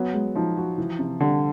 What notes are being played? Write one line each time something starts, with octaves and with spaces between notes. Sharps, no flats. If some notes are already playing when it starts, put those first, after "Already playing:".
Already playing: F#3 B3
G#3
F3 D#4
F#4
E3
C3
D3 G3